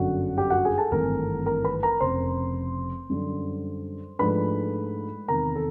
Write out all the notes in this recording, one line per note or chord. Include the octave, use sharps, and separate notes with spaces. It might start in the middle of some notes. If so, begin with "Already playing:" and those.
Already playing: G1 F#2 D3 F#4 F#5
G4 G5
F#4 F#5
G#4 G#5
A4 A5
G#1 G2 E3 A3 C4 A#4 A#5
A#4 A#5
B4 B5
A#4 A#5
F1 F2 C#3 C5 C6
F#2 D3 G3
G#2 F3 A3 D4 B4 B5
E2 C3 D#3 A#4 A#5
A4